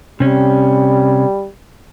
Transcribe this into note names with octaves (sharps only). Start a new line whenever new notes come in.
C3 G3 C#4